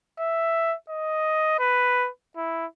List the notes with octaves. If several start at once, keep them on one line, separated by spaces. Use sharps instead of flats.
E5
D#5
B4
E4